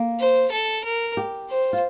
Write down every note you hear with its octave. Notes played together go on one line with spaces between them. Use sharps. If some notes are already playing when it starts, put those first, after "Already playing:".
Already playing: A#3
C5
A4
A#4
G4
C5
F4